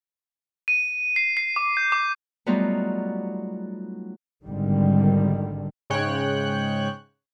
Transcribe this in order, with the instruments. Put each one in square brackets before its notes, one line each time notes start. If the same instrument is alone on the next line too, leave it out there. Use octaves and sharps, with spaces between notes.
[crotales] D#7
C7
C7
D6
G6
D6
[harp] F#3 G3 A3 B3 D#4 F4
[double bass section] G#1 D3 D#3 G3
[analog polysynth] G#2 C#3 G#3 C#5 G5 F#6